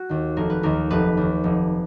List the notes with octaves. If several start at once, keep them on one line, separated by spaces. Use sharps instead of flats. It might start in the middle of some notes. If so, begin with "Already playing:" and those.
Already playing: F#4
D#2 D#3
F1 A#4
B4
D#2 D#3 A#4
F1 B4
D#2 D#3
F1